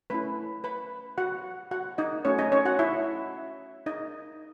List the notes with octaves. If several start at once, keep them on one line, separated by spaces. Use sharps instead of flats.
A3 C#4 E4 B4 B5
B4 B5
F#4 F#5
F#4 F#5
D#4 D#5
A3 C#4 D#4 F#4 C#5
D#4 D#5
C#4 C#5
F#4 F#5
E4 E5
D#4 D#5